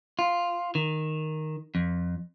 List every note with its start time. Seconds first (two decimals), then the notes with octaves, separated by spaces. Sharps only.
0.19 F4
0.75 D#3
1.75 F2